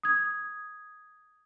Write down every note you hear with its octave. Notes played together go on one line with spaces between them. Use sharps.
D#6 G#6